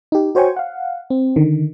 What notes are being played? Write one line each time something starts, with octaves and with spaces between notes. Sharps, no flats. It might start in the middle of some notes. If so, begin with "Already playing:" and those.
D#4 G4
F#4 C5 C#5 G5 G#5 C#6
F5 F#5
C4
D3 D#3